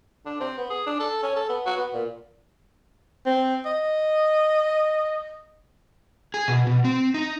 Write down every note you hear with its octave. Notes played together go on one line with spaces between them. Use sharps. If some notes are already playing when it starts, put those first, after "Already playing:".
D4
C4
B3
G#4
D4
A4
C#4
A4
B3
F#4
B3
A#2
C4
D#5
G#4
B2
B2
C4
D#4